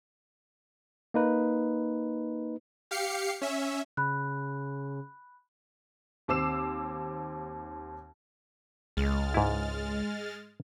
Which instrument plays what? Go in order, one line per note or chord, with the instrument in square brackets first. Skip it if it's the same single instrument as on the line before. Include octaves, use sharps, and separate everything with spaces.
[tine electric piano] A#3 D#4 B4
[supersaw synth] G4 F5 C7 C#7
C#4 E5
[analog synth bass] C#3 [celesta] B5 F#6
[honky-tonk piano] D#2 C4 D6 E6 C7 E7
[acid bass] C#2 [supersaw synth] G#3 F6 A6
[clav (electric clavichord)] G#2 E4